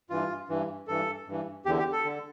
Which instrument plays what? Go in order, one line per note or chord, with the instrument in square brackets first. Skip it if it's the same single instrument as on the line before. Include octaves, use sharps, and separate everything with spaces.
[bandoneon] G2 E3 F4
G2 E3
G2 E3 A4
G2 E3
E2 D3 G4
G4
A4
D3